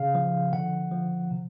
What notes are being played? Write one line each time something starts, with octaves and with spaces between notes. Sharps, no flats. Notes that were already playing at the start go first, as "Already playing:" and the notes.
Already playing: C#3 F5
F3
D3 F#5
F3
C3